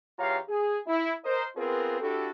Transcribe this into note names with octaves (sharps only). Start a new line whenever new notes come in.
E2 F4 G4 C#5 F5 A#5
G#4
E4
A#4 C5 D#5
B3 C4 F4 G#4 A#4 B4
D4 E4 F#4 G4 A4